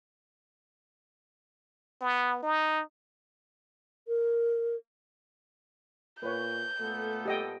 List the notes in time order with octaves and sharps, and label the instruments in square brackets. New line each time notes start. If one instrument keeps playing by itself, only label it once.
[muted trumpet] B3
D#4
[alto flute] A#4
[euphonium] A#2 [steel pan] B4 C#5 [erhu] G6
[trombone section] A#2 B3 A4 [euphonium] A3
[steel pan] G4 D#5 G5